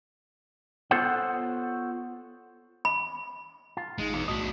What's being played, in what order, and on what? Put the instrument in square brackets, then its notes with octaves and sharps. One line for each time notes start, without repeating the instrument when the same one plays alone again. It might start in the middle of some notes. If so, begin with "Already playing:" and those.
[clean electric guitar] B3 F4 A4 C5 C#5 F#5
[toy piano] B5
[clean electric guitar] F4
[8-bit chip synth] A1 D#4 C#7 [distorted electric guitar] G#3
[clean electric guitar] E2 [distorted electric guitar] B2 F5
[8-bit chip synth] B1 F#4 B6 [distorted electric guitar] A2 D4 [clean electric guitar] D#5